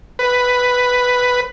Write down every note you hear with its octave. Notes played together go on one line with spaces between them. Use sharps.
B4